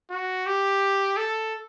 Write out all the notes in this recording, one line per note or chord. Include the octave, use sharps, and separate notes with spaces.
F#4
G4
A4